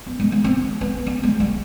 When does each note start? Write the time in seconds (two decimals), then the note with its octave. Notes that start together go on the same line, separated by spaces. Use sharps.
0.06 B3
0.19 G#3
0.32 B3
0.44 C4
0.81 B3
1.07 B3
1.23 G#3
1.40 G3